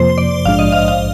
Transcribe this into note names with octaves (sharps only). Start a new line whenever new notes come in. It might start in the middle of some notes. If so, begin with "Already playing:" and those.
Already playing: F2 C3 F3 A#3 C5
D5
A#1 G#2 F3 G#3 D4 F5
D#5
F5
F5